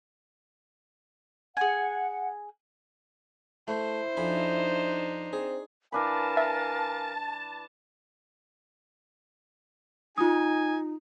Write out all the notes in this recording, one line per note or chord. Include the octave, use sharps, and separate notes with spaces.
G#4 F#5 G#5
A3 E4 C5
F2 D4 D#4 G#5 B5
C4 G#4
E3 D4 A#4 F5 G#5 A5 B5
E5
D#4 F4 G#5 D#6